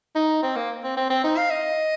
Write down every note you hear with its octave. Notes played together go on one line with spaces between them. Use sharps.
D#4
C4
A#3
C4
C4
C4
D#4
F5
D#5